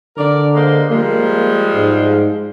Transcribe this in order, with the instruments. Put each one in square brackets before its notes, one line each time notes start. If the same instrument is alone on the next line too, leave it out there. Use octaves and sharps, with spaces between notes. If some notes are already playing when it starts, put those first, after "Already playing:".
[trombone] D3 [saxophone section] A#4 D5
[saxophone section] G#3 A#3 C5
[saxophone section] F3 G3 G#3 [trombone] A#3
[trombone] G#2